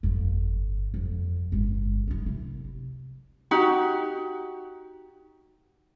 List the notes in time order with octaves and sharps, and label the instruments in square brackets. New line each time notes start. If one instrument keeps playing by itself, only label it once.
[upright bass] G1 F2
F2
G1 G#3
D#4 E4
C2
[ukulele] D#4 F#4 G4